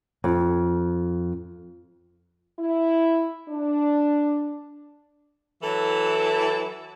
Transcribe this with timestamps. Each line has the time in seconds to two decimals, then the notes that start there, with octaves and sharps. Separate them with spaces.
0.24 F2
2.59 E4
3.49 D4
5.63 E3 F#3 E4 A4